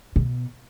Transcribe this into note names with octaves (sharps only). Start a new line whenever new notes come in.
B2